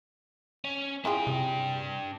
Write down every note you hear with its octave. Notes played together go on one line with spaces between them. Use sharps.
C#4
D4 E4 F4 G#4 G5
C3